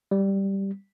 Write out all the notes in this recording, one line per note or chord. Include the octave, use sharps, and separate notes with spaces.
G3